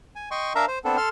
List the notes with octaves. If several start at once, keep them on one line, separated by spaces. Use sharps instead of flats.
G#5
D#5 G5 C6 C#6
D4 A#4 E5 F5 A#5
C5
B3 C4 D4 A4
A4 C6 F6